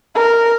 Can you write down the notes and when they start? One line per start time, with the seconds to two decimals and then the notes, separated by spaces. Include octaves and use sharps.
0.15 A#4